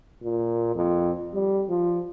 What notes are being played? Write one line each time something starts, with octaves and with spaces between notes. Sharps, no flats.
A#2
F2
G3
F3